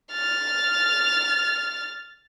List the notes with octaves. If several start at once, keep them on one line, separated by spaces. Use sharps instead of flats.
F6 A6